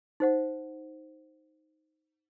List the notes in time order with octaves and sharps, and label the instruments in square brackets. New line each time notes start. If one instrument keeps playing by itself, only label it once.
[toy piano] D#4 C5 F#5